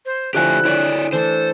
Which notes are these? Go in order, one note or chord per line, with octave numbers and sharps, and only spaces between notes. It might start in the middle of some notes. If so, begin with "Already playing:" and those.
C5
D3 F3 E4 G4 E5 G#5 F#6
E4 G#4 B4 C#5 D5 E5
E3 A3 D4 A4 C5